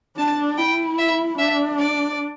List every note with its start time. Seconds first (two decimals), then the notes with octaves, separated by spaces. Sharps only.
0.18 D4 A5
0.58 E4 G5
0.98 E5
1.38 D4 E5
1.78 D5